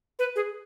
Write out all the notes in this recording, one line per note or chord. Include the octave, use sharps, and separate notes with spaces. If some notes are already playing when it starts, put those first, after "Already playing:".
B4
G#4